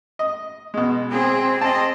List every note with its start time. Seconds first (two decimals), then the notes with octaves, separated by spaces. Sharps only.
0.19 D#5
0.74 B2 G#3
1.11 C4 G#4
1.61 C4 D#5 A5